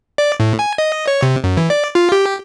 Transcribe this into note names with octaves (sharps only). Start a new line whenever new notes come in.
D5
A2
G#5
D#5
C#5
C3
F#2
E3
D5
F4
G4